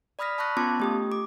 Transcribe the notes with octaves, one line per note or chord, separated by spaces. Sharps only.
D5 B5 D#6 F6 A#6 B6
A5 B5 C#6 F#6 A#6
B3 C#4 F4 A5 C6 D6
A3 G4 D#6
D6